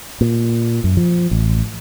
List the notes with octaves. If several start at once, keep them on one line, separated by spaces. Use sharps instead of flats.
A#2
F#2
F3
A1